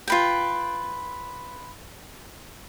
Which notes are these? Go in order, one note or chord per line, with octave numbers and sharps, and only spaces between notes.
F4 B4 G5